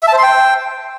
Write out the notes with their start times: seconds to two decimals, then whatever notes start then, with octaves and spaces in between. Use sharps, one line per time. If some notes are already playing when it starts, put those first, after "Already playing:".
0.03 E5
0.08 A5
0.13 C5
0.18 C6
0.23 G5